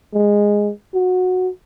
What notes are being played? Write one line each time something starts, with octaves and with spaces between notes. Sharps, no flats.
G#3
F#4